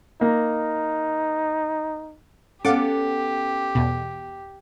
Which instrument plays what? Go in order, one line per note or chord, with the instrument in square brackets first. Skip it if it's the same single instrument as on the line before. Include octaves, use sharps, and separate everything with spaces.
[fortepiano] A#3 [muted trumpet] D#4
[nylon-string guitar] B3 A4 [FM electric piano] C#4 [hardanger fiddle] G4 [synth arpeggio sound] F5 F#5 D6
[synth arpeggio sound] E2 B2